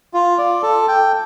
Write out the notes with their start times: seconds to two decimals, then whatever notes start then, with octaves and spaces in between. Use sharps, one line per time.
0.14 F4
0.38 D5
0.62 A4
0.88 G5